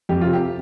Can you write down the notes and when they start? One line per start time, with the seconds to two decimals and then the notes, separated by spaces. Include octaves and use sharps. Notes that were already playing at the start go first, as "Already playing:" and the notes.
0.09 F2 G4
0.21 C3 F4
0.33 G4